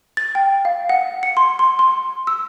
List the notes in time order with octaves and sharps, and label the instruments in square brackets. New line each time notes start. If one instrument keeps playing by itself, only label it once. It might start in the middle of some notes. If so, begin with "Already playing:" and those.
[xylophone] A6
G5
F5
F#5
C#7
C6
C6
C6
E6